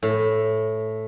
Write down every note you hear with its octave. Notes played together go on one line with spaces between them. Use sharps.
A2